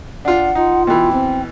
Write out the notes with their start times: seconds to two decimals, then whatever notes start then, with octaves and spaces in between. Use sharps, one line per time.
0.25 D4 F4 F#5
0.55 D#4 F4
0.87 B2 E3 G5
1.12 C4